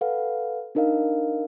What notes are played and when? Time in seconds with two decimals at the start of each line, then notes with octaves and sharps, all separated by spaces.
0.01 A4 B4 F5 F#5
0.75 D4 D#4 A#4 D#5 F5